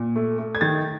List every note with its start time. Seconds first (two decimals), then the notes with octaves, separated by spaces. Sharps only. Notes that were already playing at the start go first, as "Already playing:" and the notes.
Already playing: A#2
0.16 A3
0.38 A3
0.55 G#6
0.61 D#3 A6